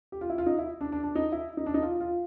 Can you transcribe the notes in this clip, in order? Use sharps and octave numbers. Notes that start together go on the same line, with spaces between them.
G4
F4
E4
F4
D#4
E4
D4
D4
D4
D#4
E4
D#4
D4
D#4
F4
F4